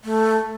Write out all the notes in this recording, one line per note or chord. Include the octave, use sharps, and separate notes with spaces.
A3